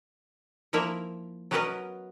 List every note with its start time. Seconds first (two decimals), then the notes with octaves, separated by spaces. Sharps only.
0.73 F3 A#3 E4 A#4 E5
1.51 F#3 B3 C#4 A#4 B4 D#5